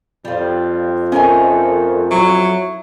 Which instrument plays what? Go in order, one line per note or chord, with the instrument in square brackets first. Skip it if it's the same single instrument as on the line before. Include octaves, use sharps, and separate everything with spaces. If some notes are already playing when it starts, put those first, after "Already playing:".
[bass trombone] F2 [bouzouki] G3 F4
[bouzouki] A3 A#3 D#4 [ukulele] C#4 G#5
[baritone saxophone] F#3 [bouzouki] E4